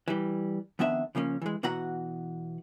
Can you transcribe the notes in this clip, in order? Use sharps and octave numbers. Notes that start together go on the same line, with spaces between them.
E3 G3
F2 D#3 B3 D4 E5
C#3 F3 A#3 C#4
E3 G#3
B2 E3 F#4 F#5 A#5